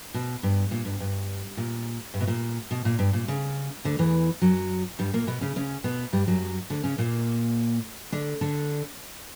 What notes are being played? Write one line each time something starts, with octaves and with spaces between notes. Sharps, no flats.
B2
G2
A#2
G2
G2
A#2
G2
B2
A#2
B2
A#2
G2
A#2
C#3
D2 D3
E2 E3
F#2 F#3
G2 G3
A#2 A#3
B2 B3
C#3 C#4
C#3 C#4
B2 B3
G2 G3
F#2 F#3
D2 D3
C#3 C#4
A#2 A#3
D3 D4
D3 D4